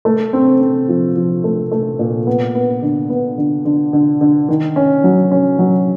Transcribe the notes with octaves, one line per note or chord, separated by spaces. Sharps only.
A3
C4
C4
F3
F3
A3
A3
A#2
B3
B3
D3
B3
D3
D3
D3
D3
D#3
C#4
F#3
C#4
F#3